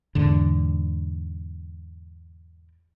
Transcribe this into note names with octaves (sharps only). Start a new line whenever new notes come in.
E2 G#2 D3